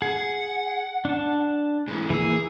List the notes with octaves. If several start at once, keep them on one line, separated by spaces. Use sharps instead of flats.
G#4 F#5
D4 A5
G#2 E3
E3 A#3 G#4 E6